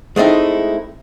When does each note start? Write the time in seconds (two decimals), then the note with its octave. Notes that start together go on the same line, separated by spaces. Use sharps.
0.16 G#3 A3 C4 D#4 E4